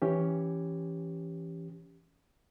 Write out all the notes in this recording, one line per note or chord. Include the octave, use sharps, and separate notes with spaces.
E3 C#4 G4